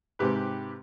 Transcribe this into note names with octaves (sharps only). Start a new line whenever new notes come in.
G#2 C3 G4 B4